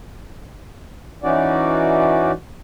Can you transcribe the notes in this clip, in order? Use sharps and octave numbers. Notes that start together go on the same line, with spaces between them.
E3 C#4 D#4 F#4 D5